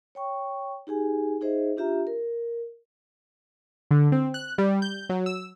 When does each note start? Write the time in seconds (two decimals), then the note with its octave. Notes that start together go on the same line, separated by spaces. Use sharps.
0.15 C#5 G5 C#6
0.87 D#4 G4 G#4 G#5
1.41 D#4 G#4 C5 D#5 E5
1.77 D4 F4 G4 E5 A#5
2.07 A#4
3.91 D3
4.12 C4
4.34 F#6
4.58 G3
4.82 G6
5.09 F#3
5.26 E6